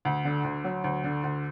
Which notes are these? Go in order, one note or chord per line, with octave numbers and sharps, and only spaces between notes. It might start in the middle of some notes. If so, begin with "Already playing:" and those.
D2
D3
D2
F#3
D2
D3
D2